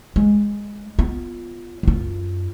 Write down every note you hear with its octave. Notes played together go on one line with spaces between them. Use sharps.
G#3
B3 F4
F#2 F4